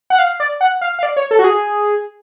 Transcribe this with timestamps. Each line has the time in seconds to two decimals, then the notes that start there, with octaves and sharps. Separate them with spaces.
0.10 F#5
0.19 F5
0.40 D5
0.61 F#5
0.81 F5
0.99 F5
1.03 D5
1.17 C#5
1.31 A4
1.39 F#4
1.44 G#4